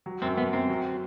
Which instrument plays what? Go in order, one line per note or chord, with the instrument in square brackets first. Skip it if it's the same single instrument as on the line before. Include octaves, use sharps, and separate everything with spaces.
[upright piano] F#3
[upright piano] F#2 [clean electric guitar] C4
[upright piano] F#2 [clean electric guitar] B3
[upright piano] F#2 [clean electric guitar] C4
[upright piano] F#3